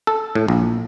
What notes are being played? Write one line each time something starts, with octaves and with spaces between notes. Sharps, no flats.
A4
A2
A#1